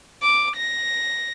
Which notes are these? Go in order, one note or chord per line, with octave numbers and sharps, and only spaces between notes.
D6
A#6